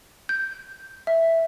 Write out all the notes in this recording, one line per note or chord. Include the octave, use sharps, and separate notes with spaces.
G6
E5